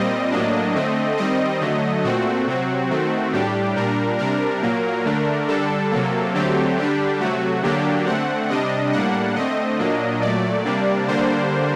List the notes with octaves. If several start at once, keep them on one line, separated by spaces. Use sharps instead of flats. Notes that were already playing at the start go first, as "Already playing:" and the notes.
Already playing: A#2 G3 C4 D#5
A2 F#3 A#3 D4
D3 A3 C4
D#3 G3 C4 D#5
D3 F#3 A3
A#2 A3 C4 F#4
C3 F#3 C4
D#3 A3 C4
A2 G3 D4 G4
A#2 G3 D4 A#4
C3 G3 D4 A#4
A#2 F#3 A#3
D3 A3 D4
D3 G3 D4 A4
C3 F#3 A#3
D3 F#3 A3 C4 G4
D3 G3 D4
C3 F#3 A3 F#4
D3 F#3 A#3 D4 G4
D3 A3 C4 F#5
C3 G3 D4 D#5
A2 G3 A#3 D4 F#5
D3 A3 C4 D#5
A#2 F#3 A#3 D4
A#2 F#3 A3 D5
C3 G3 A#3 D4
D3 G3 A#3 D4 C5